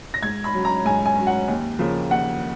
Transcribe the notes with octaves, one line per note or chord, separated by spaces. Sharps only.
A#6
G#2 G#6
B5
F#3 C#4
A#5
G#2 G#5
G#5
F#3 C#4
F#5
D#2
C#3 F3 A#3
D#2 F#5